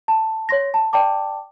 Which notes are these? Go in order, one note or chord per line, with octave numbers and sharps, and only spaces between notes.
A5
C#5 C6 A#6
A5
D5 G5 A5 D6